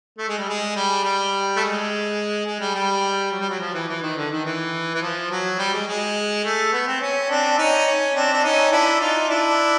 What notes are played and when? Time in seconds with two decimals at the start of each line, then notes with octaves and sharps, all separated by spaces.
0.18 A3
0.29 G#3
0.38 G3
0.49 G#3
0.76 G3
1.04 G3
1.56 A3
1.61 G#3
2.46 G#3
2.60 G3
2.75 G3
3.32 F#3
3.40 G3
3.49 F#3
3.60 F3
3.74 E3
3.89 E3
4.02 D#3
4.17 D3
4.31 D#3
4.45 E3
4.94 E3
5.02 F3
5.31 F#3
5.59 G3
5.73 G#3
5.87 G#3
6.45 A3
6.73 B3
6.87 C4
7.01 C#4
7.29 C4 D4
7.58 C#4 D#4
7.87 C#4
8.15 C4 D4
8.33 D4
8.44 C#4 D#4
8.72 D4 E4
9.00 D#4 F4
9.29 D4 E4